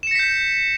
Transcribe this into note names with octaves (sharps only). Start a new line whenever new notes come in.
G6 A#6 B6 C#7 E7